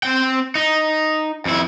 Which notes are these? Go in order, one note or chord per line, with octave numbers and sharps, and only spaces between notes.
C4 G5
D#4
F2 E4